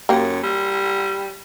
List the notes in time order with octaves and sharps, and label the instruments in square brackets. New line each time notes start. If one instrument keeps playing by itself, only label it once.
[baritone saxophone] F#2 [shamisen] A#3 G4
[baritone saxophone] G3